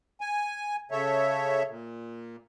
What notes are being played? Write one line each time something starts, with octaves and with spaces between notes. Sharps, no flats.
G#5
C#3 A4 C#5 E5
A#2